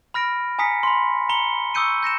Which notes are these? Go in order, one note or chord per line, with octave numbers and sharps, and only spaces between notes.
B5 F6 A#6 D7
G#5 A#5 D#6 B6 C#7
B5 C6
A#5 B5 C#7 G7
C#6 D#6 E6 G6 C#7 D#7
G6 A#6 C#7 E7